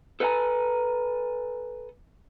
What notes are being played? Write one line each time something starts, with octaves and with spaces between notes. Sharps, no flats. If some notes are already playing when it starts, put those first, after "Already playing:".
A4 B4 C#5 F#5 G#5 A#5